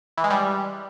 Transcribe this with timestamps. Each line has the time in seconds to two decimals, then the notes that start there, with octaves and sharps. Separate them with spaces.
0.17 E3
0.24 G#3
0.30 G3